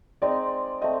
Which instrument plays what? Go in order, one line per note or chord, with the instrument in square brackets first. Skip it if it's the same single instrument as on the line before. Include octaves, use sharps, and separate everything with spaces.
[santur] G#3 C4 D#4 [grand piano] D5
[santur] A3 C4 [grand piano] D#5